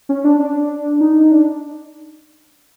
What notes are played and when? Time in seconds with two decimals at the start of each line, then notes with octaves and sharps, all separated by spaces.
0.09 C#4
0.24 D4
0.40 D4
1.01 D#4
1.32 D4